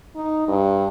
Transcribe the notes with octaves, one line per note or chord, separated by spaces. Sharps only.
D#4
G2